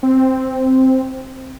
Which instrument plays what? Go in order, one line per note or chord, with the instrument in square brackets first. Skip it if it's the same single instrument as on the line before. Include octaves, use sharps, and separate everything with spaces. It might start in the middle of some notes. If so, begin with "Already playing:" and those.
[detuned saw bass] C4